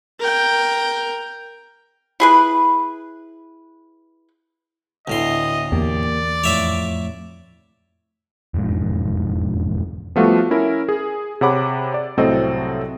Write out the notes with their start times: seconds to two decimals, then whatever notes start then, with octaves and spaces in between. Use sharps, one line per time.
0.20 A#4 G5
2.20 E4 G#4 B4
5.08 D2 A2 B3 E4 D#5 C6
5.72 E2 A#3 G4 D5
6.44 F2 A2 C#5 E5 D6
8.54 E1 F2 G#2
10.16 F3 G3 A3 B3 F4 F#4
10.51 C#4 E4 A#4
10.89 G#4
11.41 C3 G#4 C#5 F#5 B5 D6
11.94 D5
12.17 C2 A2 F#3 C4 A4 D#5